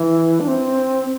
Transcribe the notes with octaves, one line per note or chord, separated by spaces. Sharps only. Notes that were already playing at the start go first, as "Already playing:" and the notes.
Already playing: E3
D4
C4